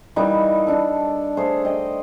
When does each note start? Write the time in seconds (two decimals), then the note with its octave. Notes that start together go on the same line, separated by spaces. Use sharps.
0.16 E3 G3 A#3 D#4
0.67 D4 A4
1.37 A3 G#4 C5
1.65 D#5 G5